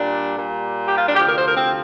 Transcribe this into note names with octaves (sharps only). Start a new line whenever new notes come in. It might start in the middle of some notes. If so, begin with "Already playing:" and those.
Already playing: A#2 G3 D4
A#2 G3
G4
F4
D4
D2 C3 F3 G4
A#4
C5
A#4
C4